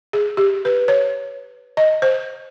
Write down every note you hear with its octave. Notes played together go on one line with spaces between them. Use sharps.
G#4
G4
B4
C#5
D#5
C5